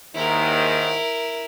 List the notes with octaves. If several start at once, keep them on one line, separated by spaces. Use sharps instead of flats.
D#2 G#2 D#3 E4 A#4